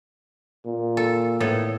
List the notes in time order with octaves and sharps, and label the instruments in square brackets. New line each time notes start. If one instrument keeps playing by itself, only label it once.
[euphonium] A#2
[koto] A4
A2 B3 A4